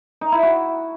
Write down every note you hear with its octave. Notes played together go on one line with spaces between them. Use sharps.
D#4
E4
F#4